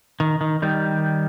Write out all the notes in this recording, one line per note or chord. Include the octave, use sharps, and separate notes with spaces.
D#3
D#3
D#3 G3